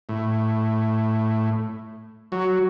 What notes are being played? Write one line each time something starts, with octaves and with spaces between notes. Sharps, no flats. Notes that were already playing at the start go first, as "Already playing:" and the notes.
A2
F#3